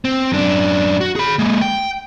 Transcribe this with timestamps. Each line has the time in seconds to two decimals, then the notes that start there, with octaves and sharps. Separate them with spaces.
0.05 C4
0.32 F#2 D4
1.01 F#4
1.16 G#4 B5
1.39 G#3 A#3
1.62 G5